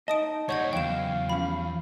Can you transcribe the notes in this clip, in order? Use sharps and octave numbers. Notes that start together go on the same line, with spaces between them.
D#4 D#5 A5 D#6 D7
D#2 G3 C#5 D#5 F#5 C#6 G6 G#6
E2 C#3 E3 F#3 F5 G5 E7
F3 G3 C#4 B5